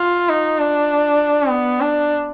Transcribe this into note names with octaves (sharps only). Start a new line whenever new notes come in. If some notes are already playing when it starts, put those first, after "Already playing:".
Already playing: F4
D#4
D4
B3
D4